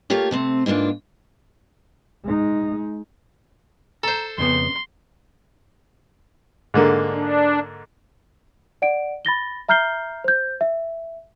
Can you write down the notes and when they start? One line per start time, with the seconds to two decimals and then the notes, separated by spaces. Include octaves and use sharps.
0.10 A3 A#3 F4 G4 C#5
0.31 C3 A3 C4
0.66 G#2 E3 A#3 D4 F4
2.24 G#3 D#4
4.03 A4 C5 A#5
4.38 F2 C#3 B3 C6
6.74 G#2 D3 A#3
7.10 D4
8.82 D5 F#5 D7
9.25 B5 A6 A#6 G7
9.69 E5 A#5 F6 G6 C7 G7
10.24 C5 G6
10.61 E5